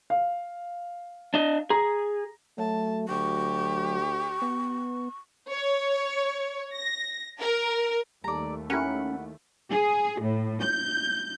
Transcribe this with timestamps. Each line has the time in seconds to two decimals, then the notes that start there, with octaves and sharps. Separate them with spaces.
0.10 F5
1.34 D4 D#5
1.70 G#4 A#5
2.58 F#3 A3 A5
3.09 D2 G4 C#6
4.42 B3
5.50 C#5
6.74 A#6
7.40 A#4
8.24 D#2 G3 A3 A4 D5 A#5
8.70 C#4 E4 G4 A#4 F#5 B5
9.70 G#4
10.21 A2
10.63 G6